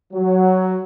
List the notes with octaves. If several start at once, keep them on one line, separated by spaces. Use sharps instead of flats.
F#3